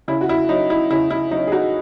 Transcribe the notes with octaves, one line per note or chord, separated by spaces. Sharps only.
C#3 E4
F#4
E4
F#3 C#4 D#4
E4
C#3 E4
E4
F#3 C#4 D#4
G#4
D#4 F#4